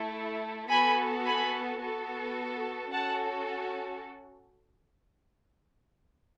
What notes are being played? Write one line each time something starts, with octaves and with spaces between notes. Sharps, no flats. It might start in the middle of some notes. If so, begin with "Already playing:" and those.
Already playing: A3 E4 A4
B3 F#4 A4 G#5 B5
G#5 B5
B3 F#4 A4
C#4 F#4 A4 F#5 A5